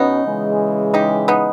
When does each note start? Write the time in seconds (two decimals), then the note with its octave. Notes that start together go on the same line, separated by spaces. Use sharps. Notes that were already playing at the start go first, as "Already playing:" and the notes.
Already playing: B2 B3 C#4 D#4 E4
0.25 C#3 E3 G#3
0.94 D#4 G4
1.28 B3 D#4